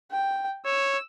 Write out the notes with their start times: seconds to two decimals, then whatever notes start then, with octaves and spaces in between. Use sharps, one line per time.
0.11 G5
0.65 C#5 E6